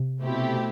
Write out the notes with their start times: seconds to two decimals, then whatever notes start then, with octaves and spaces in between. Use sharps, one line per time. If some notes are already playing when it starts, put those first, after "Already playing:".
Already playing: C3
0.22 B2 A3 C4 E4 G4